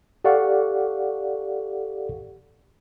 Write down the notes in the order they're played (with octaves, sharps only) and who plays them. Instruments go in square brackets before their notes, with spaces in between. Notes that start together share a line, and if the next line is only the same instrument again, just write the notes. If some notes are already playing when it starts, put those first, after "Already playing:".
[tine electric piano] G4 A4 D5 F5 F#5 C#6